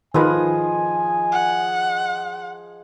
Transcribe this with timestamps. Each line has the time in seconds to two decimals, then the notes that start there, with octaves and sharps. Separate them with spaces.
0.14 D#3 F3 G#4 A#4 B4 D#5 G#5
1.32 F#5